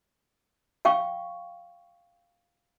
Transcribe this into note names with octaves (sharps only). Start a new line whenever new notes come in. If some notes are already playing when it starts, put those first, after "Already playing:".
F5 G5 C#6